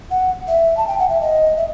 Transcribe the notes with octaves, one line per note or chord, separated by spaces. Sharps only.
F#5
E5
A5
G5
F#5
E5
D#5
E5